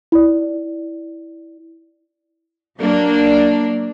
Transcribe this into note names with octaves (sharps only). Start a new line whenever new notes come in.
E4 D5
F#3 A#3 D4